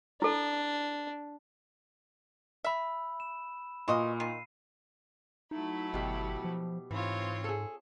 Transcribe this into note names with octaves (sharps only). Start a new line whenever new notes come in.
D4 E4 A4
E5 B5 E6
E7
A#2 E3 F#4 D#5 C6
D#3 C7 D#7
F#3 A3 D#4 E4
G1 B2 G4
F3
G#2 E3 C4 F4 C#5
G#4 A4